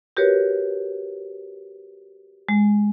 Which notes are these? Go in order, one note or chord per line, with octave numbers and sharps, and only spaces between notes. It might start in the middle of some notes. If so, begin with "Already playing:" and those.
F#4 G4 A#4 B4 C#5
G#3